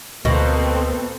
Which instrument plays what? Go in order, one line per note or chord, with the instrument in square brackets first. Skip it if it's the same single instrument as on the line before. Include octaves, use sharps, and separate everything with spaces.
[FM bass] D2 [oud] B2 [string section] A#3 C4 A4